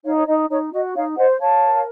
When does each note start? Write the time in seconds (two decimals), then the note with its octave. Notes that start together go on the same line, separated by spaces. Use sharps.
0.04 D#4 C#5 F5
0.16 C#5
0.26 D#4 D#5
0.49 D#4 C#5
0.72 F#4 D#5
0.95 D#4 C#5 F5
1.17 C5 D#5 F#5
1.40 C#5 F5 A5
1.63 A#4